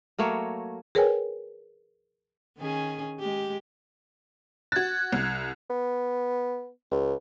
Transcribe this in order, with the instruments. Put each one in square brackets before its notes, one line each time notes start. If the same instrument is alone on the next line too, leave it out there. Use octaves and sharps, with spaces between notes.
[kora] F#3 A3 A#3 C#5
[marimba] G#4 A#4 B4 C#5 G5 G#5
[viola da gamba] D#3 C#4 G#4
G#3 G4
[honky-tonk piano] F#4 A6 [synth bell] F#6 G#6
[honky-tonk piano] C2
[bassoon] B3
C#2